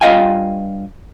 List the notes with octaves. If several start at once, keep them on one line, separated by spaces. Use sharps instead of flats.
G2 F4 D#5 F5 G5 G#5